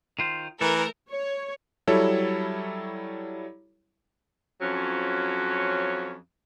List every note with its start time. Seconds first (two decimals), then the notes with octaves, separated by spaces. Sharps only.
0.19 D#3 F4 C5
0.61 E3 A3 A4 A#4
1.10 C#5
1.87 F#3 G3 E4 A4 C#5
4.62 F2 F3 F#3 C#4